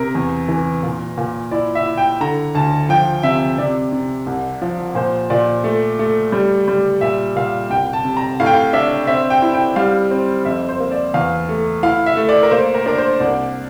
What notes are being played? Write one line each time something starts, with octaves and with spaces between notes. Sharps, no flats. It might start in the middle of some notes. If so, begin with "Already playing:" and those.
Already playing: C3 A#4
E2
E3
A#2
A#2
E4 D5
E5
E4
G5
D3 A#5
D2 A5
F3 G5
C3 E5
C3 D5
C3
C2
F3
A#2 C5
A#2 D5
A3
A3
G3
G3
A#2 E5
A#2 F5
C2 G5
A5
C3
A#5
A2 F5
G5
F5
D4 E5
C4 E5
G5
E4
G5
G3 F5
C4
F2 E5
C5
A#3
D5
E2 F5
A3
E4 F5
E5
A3
D5
A#4
A#3 C5
A#4
D4 A#4
C5
C2 D5